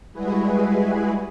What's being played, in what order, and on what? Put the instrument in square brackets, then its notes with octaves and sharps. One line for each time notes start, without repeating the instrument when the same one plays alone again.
[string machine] G3 G#3 E4 F#4 G#4 B4